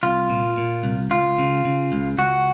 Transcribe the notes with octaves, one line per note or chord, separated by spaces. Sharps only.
C2 F4
A#2
A#2
C2
C#2 F4
C#3
C#3
C#2
C#2 F#4